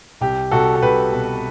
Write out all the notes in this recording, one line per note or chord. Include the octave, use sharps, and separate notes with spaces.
C2 G4
C2 F#4 A4
A4
C2 G4 B4
B2